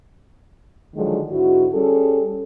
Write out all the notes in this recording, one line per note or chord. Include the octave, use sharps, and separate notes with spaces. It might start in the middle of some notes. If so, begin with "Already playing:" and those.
D3 D#3 F3 F#3 G#3
G#2 D3 E4 F#4
G3 C#4 G#4 A4